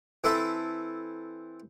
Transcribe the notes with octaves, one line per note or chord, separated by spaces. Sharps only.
E3 C4 E4 A4 E5